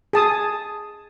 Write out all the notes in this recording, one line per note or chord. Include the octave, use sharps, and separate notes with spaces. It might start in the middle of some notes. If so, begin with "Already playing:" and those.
G#4 A5 D#6